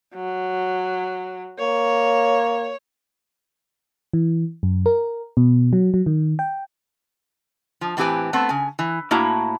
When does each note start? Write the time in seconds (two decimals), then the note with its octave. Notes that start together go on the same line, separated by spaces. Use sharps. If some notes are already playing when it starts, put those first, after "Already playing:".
0.15 F#3
1.59 A#3 C#5
4.13 E3
4.63 F#2
4.86 A#4
5.37 B2
5.73 F#3
5.94 F#3
6.06 D#3
6.39 G5
7.81 F3
7.97 A2 E3 C4 G4 B4 G#5
8.33 A3 B3 C4
8.49 C#3 G#5
8.79 E3
9.11 A2 A#3 E4 F#4 C#5